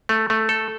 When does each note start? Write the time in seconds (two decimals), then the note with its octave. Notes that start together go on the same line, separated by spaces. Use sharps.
0.09 A3
0.30 A3
0.49 A4